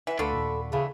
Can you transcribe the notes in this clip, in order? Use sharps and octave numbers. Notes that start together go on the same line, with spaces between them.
E3 E5 F#5
D2 A3 D4 F4 F#4 A4 B4
D#2 A#2
C#3 E3 A3